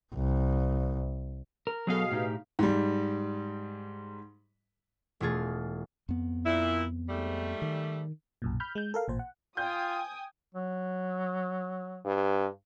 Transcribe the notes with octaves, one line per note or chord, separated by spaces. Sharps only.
C2
A#4
B2 F#3 B3 G#4 A4 F5
A2 D#4 G4
G#2 G3
E1 A3 F4 G#4 A6
F2 B3
A#2 E4
G#2 G3 A3
D#3
B1 F#2 A#2
B5 F6 G6
G#3 G6
A4 A#4 F5
A1 A#2 C5
F#5
F4 G5 G#5 D#6 G6
F#3
G2